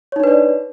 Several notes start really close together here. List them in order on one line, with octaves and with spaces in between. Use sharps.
C#5 D#4 D4 B4 D5